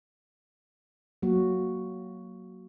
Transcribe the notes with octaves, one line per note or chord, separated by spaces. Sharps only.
F#3 A#3 F#4